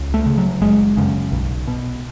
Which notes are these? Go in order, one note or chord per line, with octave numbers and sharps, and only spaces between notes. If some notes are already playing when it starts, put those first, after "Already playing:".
Already playing: C#2
A3
C#3
F#3
F#1 G#3
F#2 C#3
B1
B2